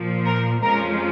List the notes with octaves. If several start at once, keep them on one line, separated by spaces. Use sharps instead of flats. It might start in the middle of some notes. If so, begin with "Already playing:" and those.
Already playing: A#2 F3 A#3
A#4
F2 F3 G#3 C#4 F4 A#4